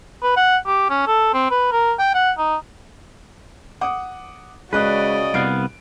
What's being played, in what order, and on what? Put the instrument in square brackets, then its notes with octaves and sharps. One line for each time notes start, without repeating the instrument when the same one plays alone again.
[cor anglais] B4
F#5
G4
C#4
A4
C4
B4
A#4
G5
F#5
D#4
[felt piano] F#5 D6 D#6
[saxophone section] C#3 D#5 [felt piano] G#3 F#6 [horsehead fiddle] F#4 D5 [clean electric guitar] B4
[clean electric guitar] C2 B3 F5 [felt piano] D7